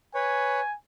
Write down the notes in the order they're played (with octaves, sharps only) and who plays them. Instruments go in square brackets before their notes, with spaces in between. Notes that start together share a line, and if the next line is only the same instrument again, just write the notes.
[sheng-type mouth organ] B4 C#5 [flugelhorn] G#5